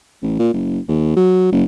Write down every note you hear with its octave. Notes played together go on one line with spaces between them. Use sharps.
A1
A#2
F#1
D#2
F#3
F#1